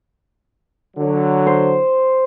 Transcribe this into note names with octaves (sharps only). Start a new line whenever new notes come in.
D3 F#3
C5